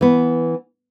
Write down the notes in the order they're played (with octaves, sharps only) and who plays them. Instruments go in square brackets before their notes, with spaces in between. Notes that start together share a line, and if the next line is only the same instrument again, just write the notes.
[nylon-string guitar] E3 B3